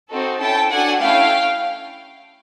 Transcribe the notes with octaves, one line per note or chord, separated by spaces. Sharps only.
C4 D#4 F#4 A4
C#4 E4 A4 G5 A5
D4 F#4 A4 F#5 G#5
A3 C#4 E4 F5 G5